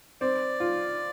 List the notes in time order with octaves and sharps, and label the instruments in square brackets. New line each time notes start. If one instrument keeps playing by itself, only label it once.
[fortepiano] C4 [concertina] D5
[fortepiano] F4